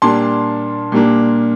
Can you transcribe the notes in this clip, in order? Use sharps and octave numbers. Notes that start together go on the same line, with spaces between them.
A#2 G3 A#3 D4 A5 C6
A#2 G3 A#3 D4